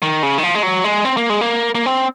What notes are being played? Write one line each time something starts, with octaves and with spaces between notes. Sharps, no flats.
D#3
C#3
D#3
F3
G#3
F#3
G#3
C4
A#3
G#3
A#3
A#3
C4